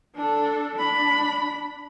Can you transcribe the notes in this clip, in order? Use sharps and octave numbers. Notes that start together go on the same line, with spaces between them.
D4 A4
D4 B5